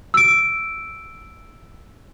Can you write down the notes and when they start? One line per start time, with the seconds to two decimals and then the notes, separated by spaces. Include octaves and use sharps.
0.14 E6 D7